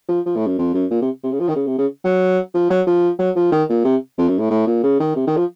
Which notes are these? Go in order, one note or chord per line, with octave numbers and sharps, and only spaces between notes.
F3
F3
A2
F#2
F2
F#2
A#2
C3
C3
C#3
F3
D#3
C#3
C3
C#3
F#3
F3
F#3
F3
F#3
F3
D#3
A#2
C3
F2
F#2
A2
A2
A#2
C#3
D#3
C3
D#3
F3